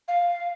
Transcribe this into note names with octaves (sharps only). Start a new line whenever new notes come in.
F5